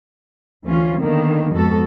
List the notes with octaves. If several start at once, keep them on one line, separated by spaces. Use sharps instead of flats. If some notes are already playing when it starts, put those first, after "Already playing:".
D2 E3 C#4 F4
D3 D#3 A#3 B3
F2 G#2 B3 F#4 A4